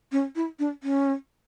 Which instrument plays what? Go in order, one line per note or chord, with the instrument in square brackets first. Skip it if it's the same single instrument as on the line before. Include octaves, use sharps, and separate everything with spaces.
[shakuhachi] C#4
E4
D4
C#4